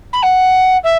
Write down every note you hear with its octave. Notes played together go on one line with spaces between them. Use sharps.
B5
F#5
E5